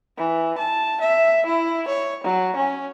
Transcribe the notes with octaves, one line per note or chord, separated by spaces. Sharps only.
E3
A5
E5
E4
C#5
F#3
C#4